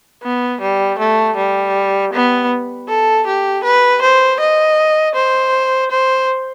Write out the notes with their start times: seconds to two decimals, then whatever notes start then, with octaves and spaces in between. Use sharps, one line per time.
0.23 B3
0.61 G3
0.99 A3
1.36 G3
2.13 B3
2.88 A4
3.27 G4
3.64 B4
4.02 C5
4.40 D#5
5.15 C5
5.91 C5